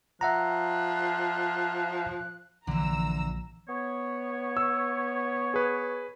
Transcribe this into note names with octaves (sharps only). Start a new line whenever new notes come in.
F3 E5 F#5 A#5 F#6
A#1 D3 E3 A#5 E6
B3 C#5
E6
G#4 B4